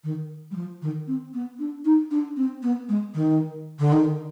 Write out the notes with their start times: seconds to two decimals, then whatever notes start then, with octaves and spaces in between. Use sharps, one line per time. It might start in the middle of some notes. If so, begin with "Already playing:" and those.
0.04 D#3
0.51 G3
0.56 F3
0.82 D#3
1.07 C4
1.34 B3
1.59 D4
1.85 D#4
2.11 D4
2.37 C4
2.63 B3
2.89 G#3
3.14 D#3
3.79 D3
3.92 D#3